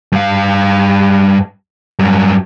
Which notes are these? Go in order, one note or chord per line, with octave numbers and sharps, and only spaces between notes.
G2 F5
G2 F#3